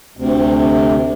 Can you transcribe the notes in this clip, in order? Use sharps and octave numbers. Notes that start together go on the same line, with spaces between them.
D2 C3